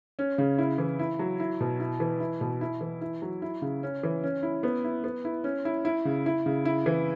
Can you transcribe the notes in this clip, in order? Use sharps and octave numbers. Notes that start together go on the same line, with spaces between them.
C#4
C#3
E4
E3
E4
F#3
E4
B2
E4
E3
E4
B2
E4
E3
E4
F#3
E4
C#3
C#4
E3
C#4
E4
B3
E4
B3
E4
C#4
E4
E4
C#3
E4
C#3
E4
E3